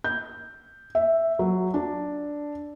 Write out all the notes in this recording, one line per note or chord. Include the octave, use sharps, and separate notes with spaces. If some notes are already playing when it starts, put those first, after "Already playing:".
G6
E5
F#3
D4